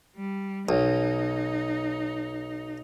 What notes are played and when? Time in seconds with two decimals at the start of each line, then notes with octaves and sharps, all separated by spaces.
0.16 G3
0.69 B1 D#4